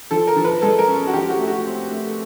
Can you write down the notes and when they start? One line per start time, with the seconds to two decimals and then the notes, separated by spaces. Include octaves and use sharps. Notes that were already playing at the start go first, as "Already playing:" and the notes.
0.11 F3 A4
0.27 A#4
0.36 F3
0.44 B4
0.62 G#3 A4
0.79 A#4
0.88 C#4
1.07 F#4
1.13 F3 G4
1.30 F#4
1.39 A3
1.48 F#4
1.65 C4
1.91 A3